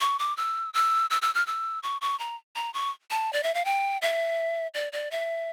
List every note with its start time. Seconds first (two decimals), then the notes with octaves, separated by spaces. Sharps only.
0.01 C#6
0.19 D6
0.37 E6
0.74 E6
1.10 E6
1.22 E6
1.35 F6
1.47 E6
1.83 C#6
2.01 C#6
2.19 A#5
2.56 A#5
2.74 C#6
3.11 A5
3.33 D5
3.43 E5
3.55 F5
3.65 G5
4.02 E5
4.74 D5
4.92 D5
5.11 E5